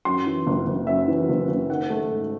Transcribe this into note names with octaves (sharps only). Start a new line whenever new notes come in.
F#2 C6
E3
F#1
F#1
F#2 E5
E3
F#1
F#1
D#3 F#5
A3
G#2